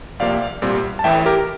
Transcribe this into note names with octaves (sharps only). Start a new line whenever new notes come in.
C2 C3 F3 A#3 D5 F5
C2 A#2 G3 C4
A5
A1 A2 E3 E5 G5
G4 A#4